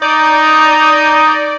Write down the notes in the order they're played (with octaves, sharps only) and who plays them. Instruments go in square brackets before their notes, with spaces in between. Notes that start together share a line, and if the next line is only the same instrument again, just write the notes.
[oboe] D#4 [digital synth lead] D5 [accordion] A#5 D#6 G6